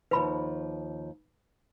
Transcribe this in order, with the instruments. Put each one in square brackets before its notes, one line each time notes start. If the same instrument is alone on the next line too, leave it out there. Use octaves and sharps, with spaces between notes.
[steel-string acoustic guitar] D#2 F3 [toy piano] B4 B5